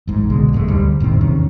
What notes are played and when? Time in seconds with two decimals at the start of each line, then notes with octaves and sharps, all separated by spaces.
0.07 A1 G#2
0.30 C2 B2 D3 G#3
0.53 F1 G#2 G#3 A3
0.68 D2 D3 G3
1.00 F#1 A2 D#3 C4
1.21 E2 C3 D#3 C#4